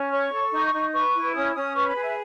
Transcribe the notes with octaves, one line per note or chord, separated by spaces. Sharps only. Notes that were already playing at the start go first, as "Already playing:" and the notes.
Already playing: C#4
C#5 C#6
A4
D#4
D#4
B4 C#6
E4
C#4 D#6
C#4 D#6
B4 C#6
B5
G#4
E5